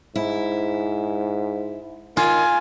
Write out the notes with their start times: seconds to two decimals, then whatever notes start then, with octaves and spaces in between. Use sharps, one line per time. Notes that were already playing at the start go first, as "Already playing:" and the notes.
0.16 G#2 E4
2.17 D#3 F4 G#5